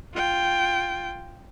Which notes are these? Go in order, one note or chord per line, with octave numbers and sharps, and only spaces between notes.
F4 G5